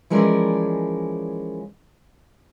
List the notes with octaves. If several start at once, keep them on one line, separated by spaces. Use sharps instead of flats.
E3 F3 G#3 C#4 A#4 D5